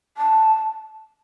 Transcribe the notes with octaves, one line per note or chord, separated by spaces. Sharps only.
A5